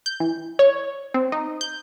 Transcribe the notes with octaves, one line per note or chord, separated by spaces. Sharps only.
G6
E3
C#5
C4
D#4
G6